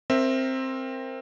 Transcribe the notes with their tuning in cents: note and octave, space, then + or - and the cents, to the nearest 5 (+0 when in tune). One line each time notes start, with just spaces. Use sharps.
C4 +10 A#4 +0 E5 +0